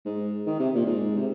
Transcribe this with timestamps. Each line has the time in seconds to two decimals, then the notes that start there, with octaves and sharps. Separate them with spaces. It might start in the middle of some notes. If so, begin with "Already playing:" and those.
0.06 G#2
0.46 D#3
0.59 C3
0.75 A#2
0.86 G#2
1.17 C3